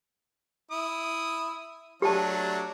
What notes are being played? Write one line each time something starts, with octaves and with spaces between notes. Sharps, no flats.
E4 D#6
F#3 A3 D4 G4 A5